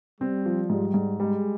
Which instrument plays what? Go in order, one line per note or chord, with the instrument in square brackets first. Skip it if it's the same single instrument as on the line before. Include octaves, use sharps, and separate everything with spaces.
[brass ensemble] G3 [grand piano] C4
[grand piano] F3
[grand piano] G#2 [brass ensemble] G3
[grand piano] G#2
[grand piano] G3 [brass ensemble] G#3